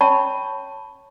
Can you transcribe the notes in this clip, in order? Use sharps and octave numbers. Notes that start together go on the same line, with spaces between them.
C#5 E5 G5 A5 B5 C#6